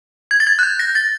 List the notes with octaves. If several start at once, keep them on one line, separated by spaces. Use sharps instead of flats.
G#6
A6
G#6
F#6
G6
A#6
A6